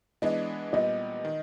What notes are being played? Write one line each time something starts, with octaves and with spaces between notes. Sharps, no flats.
E3 G#3 B3 D4 D#5
A#2 G3 B3 D#5
D#3